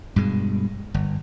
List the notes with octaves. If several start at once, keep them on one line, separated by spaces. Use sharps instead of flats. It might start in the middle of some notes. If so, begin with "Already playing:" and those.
G2 B2 G#3
G1